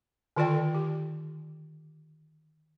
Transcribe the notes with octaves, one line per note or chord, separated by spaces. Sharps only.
D3 D#3 F4 A4 D5 G5
G4